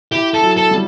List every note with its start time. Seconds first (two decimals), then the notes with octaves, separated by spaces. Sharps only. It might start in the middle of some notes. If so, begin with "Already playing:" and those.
0.11 E4 G4
0.34 A4
0.41 F#3
0.57 A4
0.71 G3